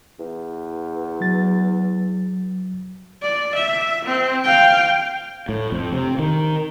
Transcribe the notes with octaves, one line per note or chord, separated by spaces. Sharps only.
E2
F#3 A6
D5
E5
C4
F5 G5
A2
F2
C3
D#3